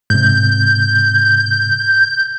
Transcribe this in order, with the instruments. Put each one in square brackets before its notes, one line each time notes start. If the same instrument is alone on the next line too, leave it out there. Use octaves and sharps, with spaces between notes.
[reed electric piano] G#2 C3 [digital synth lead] G6